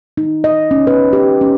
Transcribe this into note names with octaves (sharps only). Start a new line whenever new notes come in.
D#4
D#5
C#4
B4
G4
C#4